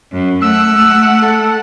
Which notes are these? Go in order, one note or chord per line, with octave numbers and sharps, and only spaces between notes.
F#2
A3 F#5 E6
A4